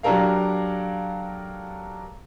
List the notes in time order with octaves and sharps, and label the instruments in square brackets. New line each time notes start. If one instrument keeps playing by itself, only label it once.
[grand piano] F#3 D4 G4 A4 A#4 F5